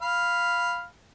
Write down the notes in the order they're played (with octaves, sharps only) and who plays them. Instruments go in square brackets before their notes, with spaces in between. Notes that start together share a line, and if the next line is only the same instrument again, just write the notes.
[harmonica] F5 B5